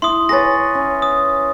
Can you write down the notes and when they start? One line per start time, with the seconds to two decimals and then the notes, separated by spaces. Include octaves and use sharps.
0.02 E4 C6 D#6
0.29 G#4 B4 C#5 A6 A#6
0.75 C#4
1.02 D#6